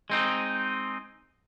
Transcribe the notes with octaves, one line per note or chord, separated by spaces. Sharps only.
G#3 C4 D#4